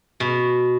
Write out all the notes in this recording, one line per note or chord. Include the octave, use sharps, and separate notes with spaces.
B2